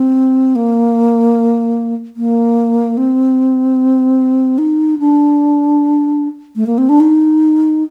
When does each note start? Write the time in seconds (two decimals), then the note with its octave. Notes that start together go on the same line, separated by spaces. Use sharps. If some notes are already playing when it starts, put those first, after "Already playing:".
Already playing: C4
0.56 A#3
2.16 A#3
2.97 C4
4.58 D#4
4.99 D4
6.56 A3
6.67 A#3
6.78 C4
6.89 D4
7.00 D#4